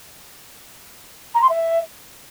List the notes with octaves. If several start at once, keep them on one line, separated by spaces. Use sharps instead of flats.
A#5
C6
E5